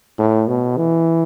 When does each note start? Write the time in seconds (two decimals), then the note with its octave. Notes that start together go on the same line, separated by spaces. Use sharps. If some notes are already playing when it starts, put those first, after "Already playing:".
0.19 A2
0.48 B2
0.77 E3